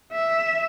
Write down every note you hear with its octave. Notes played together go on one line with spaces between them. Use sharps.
E5